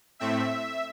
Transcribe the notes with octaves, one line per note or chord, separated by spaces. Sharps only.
A2 A3 C4 E5